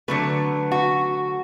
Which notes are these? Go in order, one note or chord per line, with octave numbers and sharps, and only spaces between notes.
D3 F#3 A3 B4
F#4